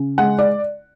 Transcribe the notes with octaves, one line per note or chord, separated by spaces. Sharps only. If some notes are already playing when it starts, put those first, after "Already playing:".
Already playing: C#3
G#3 F#5
D5